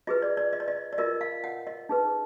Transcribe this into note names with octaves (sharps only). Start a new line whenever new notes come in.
F4 G#4 B4 D#5
D5
D5
D#5
D5
D#5
D5
F4 A#4 D#5
F5
F#5
D#5
D#4 G#4 B4